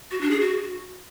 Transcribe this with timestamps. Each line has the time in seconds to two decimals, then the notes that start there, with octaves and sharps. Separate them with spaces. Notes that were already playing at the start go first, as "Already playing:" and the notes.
0.11 F#4
0.21 D4
0.31 G#4
0.41 F#4